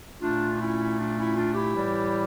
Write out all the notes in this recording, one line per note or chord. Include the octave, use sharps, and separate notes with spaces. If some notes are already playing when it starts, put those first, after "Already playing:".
A#2 A3 D4 F4
D4
C#4 E4
D4 F4
C#4 E4
D4 F4
E4 G4
A2 E3 G3